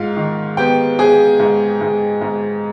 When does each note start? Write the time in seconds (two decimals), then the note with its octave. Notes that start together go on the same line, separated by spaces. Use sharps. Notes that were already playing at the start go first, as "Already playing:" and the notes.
Already playing: G#2 F4 F5
0.17 D#3
0.57 B3 G4 G5
0.99 B3 G#4 G#5
1.40 G#2
1.81 G#2
2.21 G#2